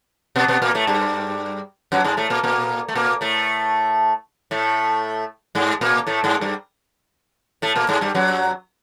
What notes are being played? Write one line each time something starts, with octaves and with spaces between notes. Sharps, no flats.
B2 B3
B2 B3
A#2 A#3
A2 A3
G2 G3
F#2 F#3
G#2 G#3
A2 A3
A#2 A#3
A#2 A#3
A3
A#2 A#3
A2 A3
A2 A3
G#2 G#3
A#2 A#3
A2 A3
G#2 G#3
G2 G3
A2 A3
A#2 A#3
G#2 G#3
G2 G3
F#2 F#3